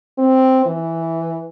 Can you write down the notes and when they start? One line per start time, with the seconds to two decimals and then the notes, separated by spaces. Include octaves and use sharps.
0.18 C4
0.66 E3